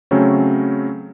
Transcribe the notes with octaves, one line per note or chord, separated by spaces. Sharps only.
C#3 F#3 A3 C4 C#4